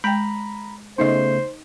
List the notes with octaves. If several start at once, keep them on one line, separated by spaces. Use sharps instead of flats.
G#3 G5 A#5 B5
C#3 A3 B3 D#4 C5 D#5